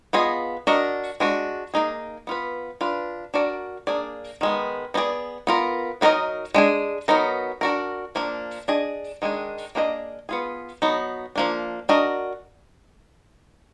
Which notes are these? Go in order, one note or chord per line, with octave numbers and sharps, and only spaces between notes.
B3 F4 G#4 D#5
D4 F#4 A#4 D#5
G#3 D4 F#4
A#3 D#4 G#4
B3 F4 B4
D4 F4 B4
D4 F#4 A#4 D5
A#3 D4 G#4 D5
D#3 G#3 B3
B3 D#4 G#4 D5
B3 F4 A#4
F#3 B3 D#4 A#4 D#5
G#3 D4 G#4
F#3 B3 D#4 A#4
D4 F#4 A#4
F3 A#3 D4
D4 G#4 D#5
D#3 G#3 D4 G#4
A#3 D4 G#4 B4 D#5
B3 F4 G#4
F#3 B3 D#4
F3 A#3 D4
D4 F#4 A#4 D#5